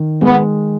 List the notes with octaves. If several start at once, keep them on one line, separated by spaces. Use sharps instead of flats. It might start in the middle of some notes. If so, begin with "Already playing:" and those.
Already playing: D#3
G#3 B3